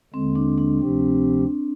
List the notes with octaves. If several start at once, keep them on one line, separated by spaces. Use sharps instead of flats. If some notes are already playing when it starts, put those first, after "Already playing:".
D#2 D3 G#3 C4
D4
D4
D2 C3 F3 C4 G4